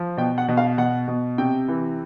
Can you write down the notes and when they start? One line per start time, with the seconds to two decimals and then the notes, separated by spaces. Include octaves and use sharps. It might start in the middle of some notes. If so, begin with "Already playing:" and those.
Already playing: F3
0.17 B2 G5
0.38 F#5
0.48 B2
0.57 F5
0.78 B2 F#5
1.08 B2
1.38 C3 G5
1.68 E3